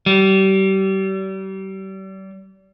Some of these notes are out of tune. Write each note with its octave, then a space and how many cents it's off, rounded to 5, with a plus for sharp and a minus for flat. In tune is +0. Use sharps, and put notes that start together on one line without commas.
G3 -35